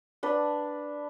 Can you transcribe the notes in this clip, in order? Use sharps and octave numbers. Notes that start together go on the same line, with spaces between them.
D4 B4